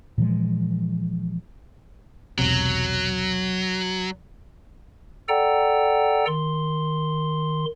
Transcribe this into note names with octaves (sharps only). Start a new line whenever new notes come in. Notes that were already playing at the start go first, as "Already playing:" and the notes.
A#2 E3 F3 G#3
E1 B1 C3 F#3
A4 D5 F#5 G5 A#5 E6
D#3 C6